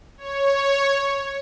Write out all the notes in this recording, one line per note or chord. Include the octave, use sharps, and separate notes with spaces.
C#5